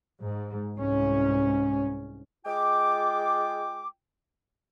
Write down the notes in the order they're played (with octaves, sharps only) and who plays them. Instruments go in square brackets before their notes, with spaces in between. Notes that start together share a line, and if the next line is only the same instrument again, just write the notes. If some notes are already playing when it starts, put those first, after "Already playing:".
[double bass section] G#2
C2 G#2 C#4
[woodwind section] G#3 F4 G5 D6